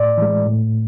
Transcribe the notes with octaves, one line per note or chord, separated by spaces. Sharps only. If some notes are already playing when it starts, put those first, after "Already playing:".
Already playing: A2 D5
E3 G#3
A2